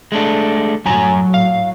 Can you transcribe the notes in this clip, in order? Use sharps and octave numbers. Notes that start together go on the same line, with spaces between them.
G#3 A3 D4
F#2 A2 F#3 G#5 A#5
F5